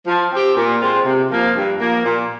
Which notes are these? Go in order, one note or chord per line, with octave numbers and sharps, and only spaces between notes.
F3
C4 G4
A#2
G#3 C4 F4 C5
C3
F3 A#3
G2
F3 A#3
A#2